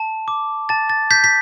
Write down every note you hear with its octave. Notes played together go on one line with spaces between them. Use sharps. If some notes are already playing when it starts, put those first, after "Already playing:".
Already playing: A5
D6
A5 A6
A6
G6 B6
B6